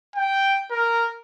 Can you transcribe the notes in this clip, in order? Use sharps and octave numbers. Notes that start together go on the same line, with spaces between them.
G5
A#4